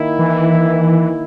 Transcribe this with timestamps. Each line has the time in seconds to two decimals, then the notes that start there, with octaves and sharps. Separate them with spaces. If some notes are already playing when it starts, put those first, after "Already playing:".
Already playing: D#3 A#3 E4
0.19 E3